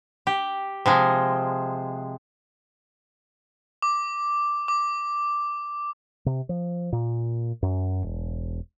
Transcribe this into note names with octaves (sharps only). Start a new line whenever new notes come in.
G4
C3 F3 G#3
D6
D6
C3
F3
A#2
F#2
E1